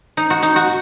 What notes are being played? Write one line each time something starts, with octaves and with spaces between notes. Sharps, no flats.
D#4
F#4
D#4
F#4